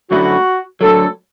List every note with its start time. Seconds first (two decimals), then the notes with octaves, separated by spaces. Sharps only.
0.11 F#2 D3 A3 E4 F#4
0.81 D2 D3 F#3 A4